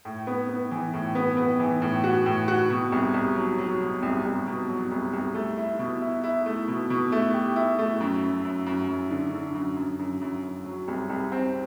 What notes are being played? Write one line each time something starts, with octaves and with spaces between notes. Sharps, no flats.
A2
B3
B3
E3
A2
B3
B3
E3
A2
F#4
A2
F#4
B2
C2
C2
F#3
F#3
B2
C2
C2
B2
F#3
C2
C2
A3
E4
B2
E4
E4
A3
B2
B2
A3
G4
E4
A3
F#2
F#2
F#2
F#2
F#2
D3
D3
F#2
F#2
F#2
F#2
F#2
F#3
C2
C2
C4